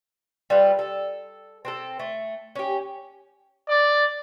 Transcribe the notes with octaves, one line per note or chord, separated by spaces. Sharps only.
G3 F4 A4 B4
A4
C4 D4 A4
A3
C#4 G4
D5